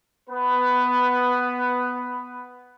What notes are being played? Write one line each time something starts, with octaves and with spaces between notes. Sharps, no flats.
B3 B4